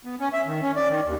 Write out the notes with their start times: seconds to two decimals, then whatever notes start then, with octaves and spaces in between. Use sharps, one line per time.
0.05 B3
0.20 C#4
0.33 E5
0.46 D#3
0.62 C#4
0.76 D5
0.89 D#3
1.06 D#2